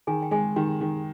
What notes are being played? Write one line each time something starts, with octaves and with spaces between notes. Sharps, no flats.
D#3 G#4 G#5
G5
G#3 G#4 G#5
D#3 G4 G5
D#3